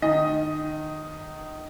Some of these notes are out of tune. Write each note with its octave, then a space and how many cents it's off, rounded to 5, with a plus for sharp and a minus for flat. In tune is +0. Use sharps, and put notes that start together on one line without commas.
D#3 -25 D#5 +5